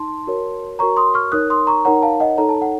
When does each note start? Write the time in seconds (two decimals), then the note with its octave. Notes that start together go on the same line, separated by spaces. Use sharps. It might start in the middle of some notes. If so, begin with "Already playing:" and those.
Already playing: D#4 A5 C6
0.27 F#4 A#4 C#5
0.79 F#4 A#4 C#5 A#5 C#6
0.97 C6 D#6
1.14 C#6 F6
1.32 D#4 A#4 C#5 D#6 F#6
1.50 C6 D#6
1.67 A#5 C#6
1.85 D#4 A#4 C#5 F#5 A#5
2.02 F5 A5
2.20 D#5 F#5
2.37 D#4 A4 C#5 A#5
2.49 A5
2.62 F#5